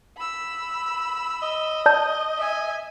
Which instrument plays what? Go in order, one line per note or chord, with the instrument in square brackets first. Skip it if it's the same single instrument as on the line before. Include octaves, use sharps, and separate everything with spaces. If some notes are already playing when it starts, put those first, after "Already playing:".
[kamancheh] B5 E6
[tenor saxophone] D#5
[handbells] D5 A5 G6
[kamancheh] E5 G#5